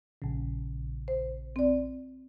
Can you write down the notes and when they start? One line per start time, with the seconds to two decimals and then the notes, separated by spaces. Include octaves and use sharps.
0.22 A#1 C#3
1.08 C5
1.56 C4 D5